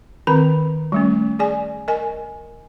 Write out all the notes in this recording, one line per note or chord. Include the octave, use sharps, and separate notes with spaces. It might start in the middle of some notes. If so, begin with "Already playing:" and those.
D#3 C4 B4 B5
G3 A3 C#4
G#4 D5 G#5
A#4 D#5 G#5